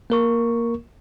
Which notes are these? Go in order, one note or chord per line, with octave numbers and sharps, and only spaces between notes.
A#3 A#4 C#6